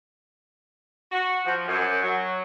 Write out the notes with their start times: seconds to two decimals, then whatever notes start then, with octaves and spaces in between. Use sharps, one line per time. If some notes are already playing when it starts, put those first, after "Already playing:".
1.12 F#4
1.45 F3
1.67 F#2
2.02 F#3